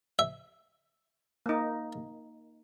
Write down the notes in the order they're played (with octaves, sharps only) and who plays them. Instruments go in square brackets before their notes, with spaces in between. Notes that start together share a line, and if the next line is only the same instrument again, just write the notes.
[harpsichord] E5
[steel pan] A#3 D#4